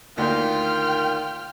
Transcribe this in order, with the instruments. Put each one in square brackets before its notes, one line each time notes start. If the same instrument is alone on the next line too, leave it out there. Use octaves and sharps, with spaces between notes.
[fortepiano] D2 A#3 [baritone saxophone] D#3 [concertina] F4 [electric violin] G5 F6